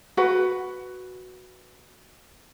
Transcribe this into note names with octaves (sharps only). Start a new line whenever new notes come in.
F#4 B4 F#5